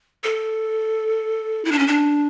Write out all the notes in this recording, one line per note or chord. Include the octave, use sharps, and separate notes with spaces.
A4
E4
D4
C#4
D4